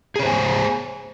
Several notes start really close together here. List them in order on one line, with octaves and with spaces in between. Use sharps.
G#4 C#5 C5 G#5